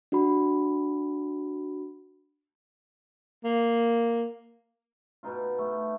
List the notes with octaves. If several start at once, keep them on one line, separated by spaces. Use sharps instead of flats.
D4 F#4 B5
A#3
B2 B3 D#4 F4
A3